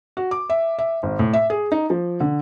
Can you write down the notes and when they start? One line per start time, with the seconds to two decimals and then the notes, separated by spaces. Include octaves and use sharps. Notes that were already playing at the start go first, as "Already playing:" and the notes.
0.17 F#4
0.31 D6
0.50 E5
0.79 E5
1.03 G#1
1.19 A2
1.33 E5
1.50 G#4
1.72 D#4
1.90 F3
2.20 D3